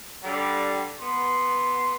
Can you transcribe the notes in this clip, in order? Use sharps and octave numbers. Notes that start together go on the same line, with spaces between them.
D3 G3
B3 C6